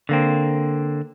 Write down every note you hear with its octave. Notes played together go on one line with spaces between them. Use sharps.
D3 A#3 C4